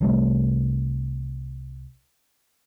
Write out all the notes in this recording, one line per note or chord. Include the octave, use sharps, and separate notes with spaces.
C2 E3 G3 A3